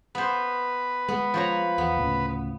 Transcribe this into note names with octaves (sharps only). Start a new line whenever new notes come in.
B3 B4 C5
G#3 B3
F3 C#5 A#5
E2 B3
D2 A2 C#3